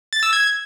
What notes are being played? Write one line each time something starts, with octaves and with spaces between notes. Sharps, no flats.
A6
E6
G#6